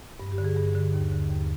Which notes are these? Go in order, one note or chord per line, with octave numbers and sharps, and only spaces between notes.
G2
G4
D3
G#4
G2 G#4
D3
D#2
D3
D#2